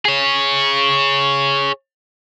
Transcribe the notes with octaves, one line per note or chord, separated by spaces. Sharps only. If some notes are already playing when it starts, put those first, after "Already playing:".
G#4 C#5